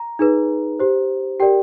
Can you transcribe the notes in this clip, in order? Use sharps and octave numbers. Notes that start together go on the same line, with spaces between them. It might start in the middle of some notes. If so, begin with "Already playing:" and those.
Already playing: A#5
D#4 G#4 B4
G4 C5
G4 A#4 D5 G5